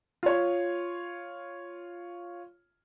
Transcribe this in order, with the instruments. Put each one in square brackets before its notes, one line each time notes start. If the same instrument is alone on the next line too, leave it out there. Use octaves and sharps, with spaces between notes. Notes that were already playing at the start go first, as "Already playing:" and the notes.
[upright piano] F4 C#5